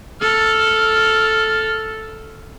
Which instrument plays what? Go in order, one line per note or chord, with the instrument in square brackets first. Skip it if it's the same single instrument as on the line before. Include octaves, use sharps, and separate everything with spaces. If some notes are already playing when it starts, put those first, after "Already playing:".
[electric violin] A4 F6